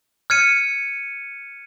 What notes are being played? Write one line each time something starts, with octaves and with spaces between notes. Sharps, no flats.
F6 G#6 C#7 D#7